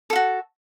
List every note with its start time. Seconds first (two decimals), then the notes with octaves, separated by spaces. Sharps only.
0.10 A4
0.13 F4
0.16 F#4